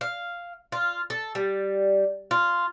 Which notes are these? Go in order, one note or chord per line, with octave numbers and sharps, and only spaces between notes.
F5
F4
A4
G3
F4